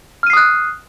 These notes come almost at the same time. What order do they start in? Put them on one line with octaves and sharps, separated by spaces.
F6 D#7 C7 D#6 F#6